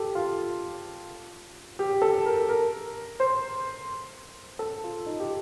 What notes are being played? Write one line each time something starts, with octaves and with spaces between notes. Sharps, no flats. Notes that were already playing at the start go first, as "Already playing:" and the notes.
Already playing: G4 A4
F4
G4
A4
A#4
A#4
C5
A4
F4
D#4
G4